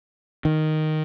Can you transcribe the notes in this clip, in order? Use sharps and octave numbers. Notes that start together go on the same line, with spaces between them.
D#3